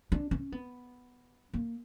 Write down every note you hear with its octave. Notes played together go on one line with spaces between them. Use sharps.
D4
C#4
B3
A#3